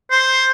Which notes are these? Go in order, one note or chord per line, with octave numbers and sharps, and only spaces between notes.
C5